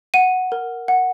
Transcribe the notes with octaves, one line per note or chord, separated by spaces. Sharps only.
F#5 D#7
A#4
F#5